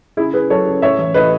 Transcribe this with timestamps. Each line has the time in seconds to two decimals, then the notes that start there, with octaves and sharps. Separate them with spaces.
0.17 C#3 E4 G#4
0.33 C#3 G#4 B4
0.50 F#3 A4 C#5
0.66 C#3
0.82 A2 C#5 E5
0.98 E3
1.14 A2 B4 D#5